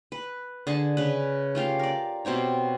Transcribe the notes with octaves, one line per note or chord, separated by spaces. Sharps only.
B4
D3 G#4 A5
C#3 B4
A3 F4 G4 F5
A#4 D5
B2 C4 G4 C#5